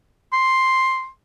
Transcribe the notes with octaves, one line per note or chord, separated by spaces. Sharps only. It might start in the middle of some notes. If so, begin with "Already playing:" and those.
C6